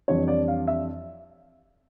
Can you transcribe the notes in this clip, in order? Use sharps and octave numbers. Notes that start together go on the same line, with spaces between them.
F2 E3 G3 D4 C#5
D5
F5
E5